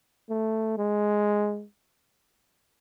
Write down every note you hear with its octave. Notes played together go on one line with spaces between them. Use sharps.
A3
G#3